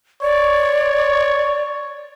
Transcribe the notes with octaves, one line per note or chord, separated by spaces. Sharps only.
C#5 D5